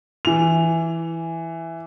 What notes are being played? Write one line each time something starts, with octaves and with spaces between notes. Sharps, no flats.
E3 F7